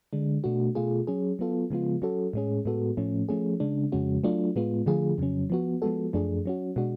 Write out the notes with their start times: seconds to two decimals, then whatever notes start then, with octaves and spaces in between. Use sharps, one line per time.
0.13 D3 G#3 D4
0.44 B2 A3 D4 F#4
0.75 B2 A3 F4 G#4
1.07 F#3 C#4 G#4
1.39 F#3 B3 F4 A4
1.70 C#3 F3 G#3 B3 F4
2.02 F#3 C#4 F#4 A4
2.33 A2 G#3 C#4 G#4
2.65 A2 G#3 B3 F#4 A4
2.97 A2 F3 A3 C#4
3.29 F3 A3 C#4 G#4
3.60 C#3 G#3 D4
3.92 F2 C#3 G#3 C#4 F#4
4.24 F#3 A3 D4 F4
4.56 A2 G#3 B3 F4
4.86 D3 F3 A3 F4 G#4
5.18 F2 C#3 F#3 C#4
5.50 F3 B3 F#4
5.82 F3 G#3 B3 F#4 A4
6.13 F#2 F3 A3 D4 G#4
6.46 F#3 C#4 F#4
6.76 B2 G#3 D4 F#4